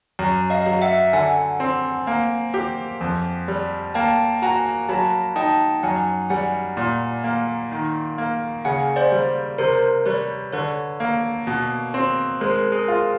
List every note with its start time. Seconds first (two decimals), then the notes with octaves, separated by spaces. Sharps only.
0.19 F#2
0.50 D#5 F5
0.66 F#3
0.82 E5 F#5
1.13 D3 F#5 G#5
1.60 C4
2.07 A#3
2.54 G4
3.01 F2
3.48 G3
3.94 A#3 G5 A5
4.42 F#4 G#5 A#5
4.89 F#3 A5 B5
5.36 D#4 G5 A5
5.83 F#2 F#5 G#5
6.29 G3 F#5 G#5
6.77 A#2
7.24 A#3
7.71 D#3
8.18 A#3
8.65 C#3 F#5 G#5
8.96 C5 D5
9.12 G3
9.58 C3 A#4 C5
10.05 G3 B4 C#5
10.52 D3 B4 C#5
11.00 A#3
11.47 B2
11.94 C4
12.41 G#3 A#4 C5
12.72 G#4 A#4
12.88 F4